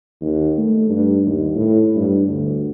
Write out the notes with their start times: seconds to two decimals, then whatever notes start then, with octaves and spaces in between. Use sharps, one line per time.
0.21 D#2
0.58 A3
0.90 G2
1.26 D#2
1.55 A2
1.96 G2
2.28 D2